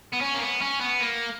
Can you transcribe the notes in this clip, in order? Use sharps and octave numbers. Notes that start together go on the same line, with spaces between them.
B3
C#4
A#3
B3
C#4
B3
A#3